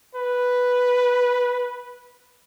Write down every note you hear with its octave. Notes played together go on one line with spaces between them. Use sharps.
B4